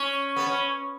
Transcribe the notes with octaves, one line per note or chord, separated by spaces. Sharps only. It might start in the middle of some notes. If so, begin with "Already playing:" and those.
Already playing: C#4
B3
C#4